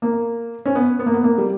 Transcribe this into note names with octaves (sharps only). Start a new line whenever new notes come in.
A#3
C#4
B3
B3
A#3
B3
A#3
G3